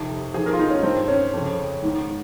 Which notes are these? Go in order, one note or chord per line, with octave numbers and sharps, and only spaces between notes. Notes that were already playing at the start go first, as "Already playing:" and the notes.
Already playing: F2 C3 D#3
F2 D#3 G#4
A#4
F4
D#4
C#4
G2 D#3 C4
C#4
F2 C#3
G#2 D#3